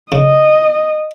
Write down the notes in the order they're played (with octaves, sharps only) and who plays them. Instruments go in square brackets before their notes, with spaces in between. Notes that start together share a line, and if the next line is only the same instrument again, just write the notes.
[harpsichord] C#3 [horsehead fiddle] D#5